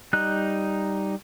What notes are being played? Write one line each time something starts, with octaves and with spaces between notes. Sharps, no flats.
G3 D#4 F#6